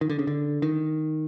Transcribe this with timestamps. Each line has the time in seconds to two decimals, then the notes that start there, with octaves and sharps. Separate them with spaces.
0.01 D#3
0.09 D3
0.19 C#3
0.27 D3
0.62 D#3